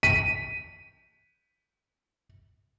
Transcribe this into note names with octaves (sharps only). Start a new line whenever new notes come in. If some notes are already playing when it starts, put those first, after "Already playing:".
B6 D#7